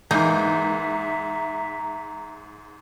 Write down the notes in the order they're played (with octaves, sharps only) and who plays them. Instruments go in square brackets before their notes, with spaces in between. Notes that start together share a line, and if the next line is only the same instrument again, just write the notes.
[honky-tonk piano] G#2 G6 [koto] E3 A#3 D#4 [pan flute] E5 [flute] A#5